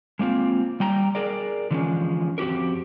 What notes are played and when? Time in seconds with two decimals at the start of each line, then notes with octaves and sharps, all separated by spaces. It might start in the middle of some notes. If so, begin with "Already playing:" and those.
0.19 G#3 A#3 C4 F4
0.80 G3 G5 A#5
1.15 G#4 A#4 D5
1.71 D3 E3 F3 G#3 A#3 C#4
2.38 F2 C4 F#4 G4 A#4